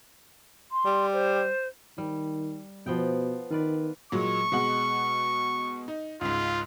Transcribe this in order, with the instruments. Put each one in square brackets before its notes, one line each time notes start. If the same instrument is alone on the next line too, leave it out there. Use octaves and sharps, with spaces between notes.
[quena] C6
[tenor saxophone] G3
[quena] C5
[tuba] D#3 [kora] G3
[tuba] B2 [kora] F3 B3 G5
[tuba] D#3 [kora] F4 B4 D5
[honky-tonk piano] A#2 F#3 G#3 [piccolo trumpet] C#6
[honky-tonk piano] B2 G#3 F#5
D#4
[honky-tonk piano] C#2 G#2 [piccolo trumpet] F4